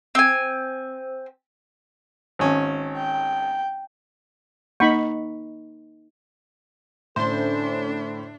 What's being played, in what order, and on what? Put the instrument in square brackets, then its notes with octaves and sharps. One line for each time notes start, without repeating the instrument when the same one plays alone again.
[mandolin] C4 G#5
[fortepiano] G#1 C#4
[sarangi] G5
[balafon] A#3 [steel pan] D#4 B5 C#6
[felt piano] A2 D3 [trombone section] C#4 A4 [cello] D4 [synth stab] C5 C6